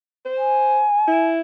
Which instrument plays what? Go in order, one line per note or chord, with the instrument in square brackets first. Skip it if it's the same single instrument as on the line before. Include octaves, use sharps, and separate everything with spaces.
[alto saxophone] C5
[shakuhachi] G#5
[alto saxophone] E4